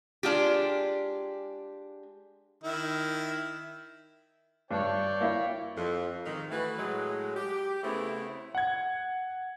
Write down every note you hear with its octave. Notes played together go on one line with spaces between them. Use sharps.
G#3 D4 F4 G4
D#3 E4
G2 C#5 D5 G5
A#3 E4
F2
G#2 D#3
E3 A3 F#4 B4
A2 F#3 G#3
G4
C#3 A3 B3 C4 E4
F#5 G#6